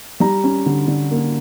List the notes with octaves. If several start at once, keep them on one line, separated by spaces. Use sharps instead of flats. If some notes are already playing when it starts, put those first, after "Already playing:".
G3 A#5
C#4
D3
D3
A#3